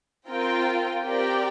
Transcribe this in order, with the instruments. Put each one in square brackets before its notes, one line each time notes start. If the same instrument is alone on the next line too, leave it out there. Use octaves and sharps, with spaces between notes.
[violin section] C4 F4 A#4 G5
C4 G4 A#4 D5 G5